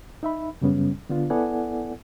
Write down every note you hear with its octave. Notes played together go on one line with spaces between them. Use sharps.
D#4 E5 B5
F#2 C#3 G3 B3 C#4
D3 B3 D4 F4
B3 E4 A4 D5 F#5 G#5